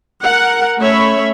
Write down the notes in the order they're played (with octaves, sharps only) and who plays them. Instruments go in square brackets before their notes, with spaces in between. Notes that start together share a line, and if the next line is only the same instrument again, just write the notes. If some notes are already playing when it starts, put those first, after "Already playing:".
[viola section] A#4 F#5
A3 C#4 C#5 E5 B5